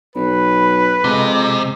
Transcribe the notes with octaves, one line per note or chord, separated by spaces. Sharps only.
B1 B4 B5
F2 C3 G#3